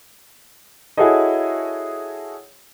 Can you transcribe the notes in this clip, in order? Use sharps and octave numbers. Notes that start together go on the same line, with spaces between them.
E4 F#4 G#4 A4 C#5 D#5